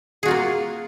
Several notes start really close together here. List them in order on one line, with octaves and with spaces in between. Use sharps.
G#4 F#4 F4 A#3